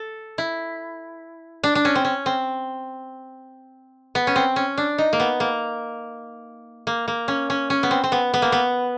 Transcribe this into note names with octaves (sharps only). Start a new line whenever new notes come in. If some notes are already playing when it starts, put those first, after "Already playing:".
Already playing: A4
E4
D4
D4
C#4
C4
C#4
C4
B3
C#4
C4
C#4
D4
D#4
A#3
B3
A#3
A#3
A#3
C#4
C#4
C#4
B3
C4
C4
B3
B3
A#3
B3